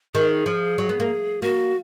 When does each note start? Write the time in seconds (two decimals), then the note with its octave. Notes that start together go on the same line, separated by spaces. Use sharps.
0.15 D#3 G#4
0.46 F3
0.78 F#3
0.89 B3
1.00 A#3
1.42 A#3 F#4